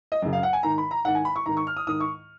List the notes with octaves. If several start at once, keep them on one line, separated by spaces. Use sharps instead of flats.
D#5
F#2 C#3
F5
F#5
G#5
G#2 D#3 A#5
B5
A#5
G#2 D#3 F#5
G#5
B5
C#6
G#2 D#3 A#5
C#6
F6
D#6
G#2 D#3 D#6
C#6